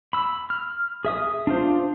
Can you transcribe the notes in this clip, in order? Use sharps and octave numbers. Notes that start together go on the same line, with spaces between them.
B5 E6
F6
G#4 E5 D#6
D4 F4 C5